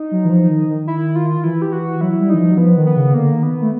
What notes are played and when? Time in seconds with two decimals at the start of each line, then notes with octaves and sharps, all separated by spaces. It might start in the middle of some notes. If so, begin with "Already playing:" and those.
Already playing: D#4
0.11 F#3
0.25 E3
0.30 F3
0.49 D#3
0.69 D#3
0.87 E4
1.16 F4
1.44 E3 E4
1.62 G4
1.73 F#4
2.01 F#3 E4
2.20 G3
2.29 E3 D#4
2.39 F3
2.51 F#3
2.58 F3 B3
2.77 D#3
2.86 B3
2.96 C#3
3.14 D3 A#3
3.33 D#3
3.43 B3
3.61 A3